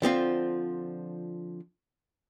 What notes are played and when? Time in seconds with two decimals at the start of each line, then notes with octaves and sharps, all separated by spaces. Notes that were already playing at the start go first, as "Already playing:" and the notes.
0.02 D3 F3 C4 F4